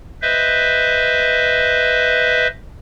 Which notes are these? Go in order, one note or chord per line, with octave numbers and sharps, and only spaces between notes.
B4 C5 D#5 E5